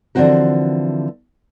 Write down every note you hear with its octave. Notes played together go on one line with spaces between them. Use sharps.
D3 E3 F3 C4 F#4 A#4